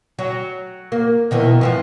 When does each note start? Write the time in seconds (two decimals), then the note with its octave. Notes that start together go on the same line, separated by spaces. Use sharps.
0.19 F#3
0.92 A#3
1.31 B2 D#3 E3
1.61 G#2 E3 F3